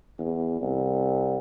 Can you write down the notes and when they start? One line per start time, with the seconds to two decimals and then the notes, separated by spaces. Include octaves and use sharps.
0.19 E2
0.61 C2